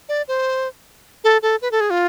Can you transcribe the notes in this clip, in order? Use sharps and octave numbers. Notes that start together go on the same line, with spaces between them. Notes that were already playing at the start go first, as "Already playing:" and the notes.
D5
C5
A4
A4
B4
A4
G#4
F4